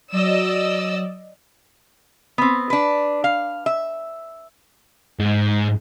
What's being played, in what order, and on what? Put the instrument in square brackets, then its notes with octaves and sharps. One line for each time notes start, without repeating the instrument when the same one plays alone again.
[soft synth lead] F#3 [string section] D5 D#5 E6
[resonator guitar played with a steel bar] B3 C4
D4 B4
F5
E5
[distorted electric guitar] G#2